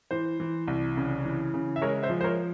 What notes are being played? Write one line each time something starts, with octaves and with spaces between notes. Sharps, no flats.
E3 C5
E3
C2
C#3
E3
C#3
E5
G#3 A#4 C#5
C5 E5
F3
C5
A#4 C#5